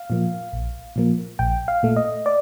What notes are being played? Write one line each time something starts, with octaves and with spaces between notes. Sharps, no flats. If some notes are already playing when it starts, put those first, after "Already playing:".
Already playing: F5
A#2 F3 A#3
A#1
A#2 F3 A#3
A#1 G5
F5
A#2 A3
D#5
D5